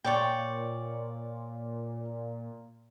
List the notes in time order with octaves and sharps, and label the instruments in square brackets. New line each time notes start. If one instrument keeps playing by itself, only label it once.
[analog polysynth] A#2 [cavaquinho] C#5 D5 G5